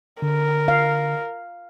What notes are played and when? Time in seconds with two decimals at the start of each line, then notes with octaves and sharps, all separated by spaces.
0.22 D3 A#4
0.68 F5